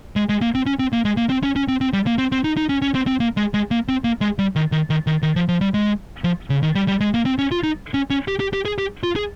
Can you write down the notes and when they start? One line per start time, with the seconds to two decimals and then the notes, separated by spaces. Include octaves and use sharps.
0.16 G#3
0.29 G#3
0.42 A#3
0.55 C4
0.66 C#4
0.79 C4
0.93 A#3
1.05 G#3
1.17 A#3
1.30 C4
1.43 C#4
1.56 C#4
1.68 C4
1.81 C4
1.93 G3
2.07 A#3
2.18 C4
2.32 C4
2.44 D#4
2.57 D#4
2.69 C#4
2.82 C#4
2.95 C4
3.07 C4
3.20 A#3
3.37 G#3
3.54 G#3
3.71 A#3
3.88 C4
4.04 A#3
4.21 G#3
4.39 G3
4.56 D#3
4.72 D#3
4.90 D#3
5.07 D#3
5.22 D#3
5.36 F3
5.48 F3
5.61 G3
5.74 G#3
6.24 F3
6.50 C#3
6.63 D#3
6.75 G3
6.88 G3
7.00 G#3
7.14 A#3
7.26 C4
7.39 C#4
7.51 F4
7.63 D#4
7.94 C#4
8.10 C#4
8.28 G4
8.40 G4
8.53 G4
8.65 G#4
8.78 G4
9.03 F4
9.16 G#4